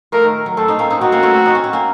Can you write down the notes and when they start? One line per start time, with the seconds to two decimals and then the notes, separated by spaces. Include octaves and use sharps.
0.12 F3 A3 A#4
0.23 D#3
0.46 F#3
0.57 A3 C4 A4
0.68 C4 D#4
0.79 A#3 C#4
0.90 C4 D#4
1.01 C4 D#4 F#4
1.12 A#3 C#4
1.23 A3 C4
1.46 D#4
1.55 C#4
1.64 C4
1.73 A#3 C#4